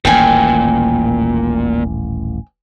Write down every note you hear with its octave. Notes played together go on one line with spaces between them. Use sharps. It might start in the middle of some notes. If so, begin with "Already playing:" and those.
D#1 A1 A#2 G5 G#5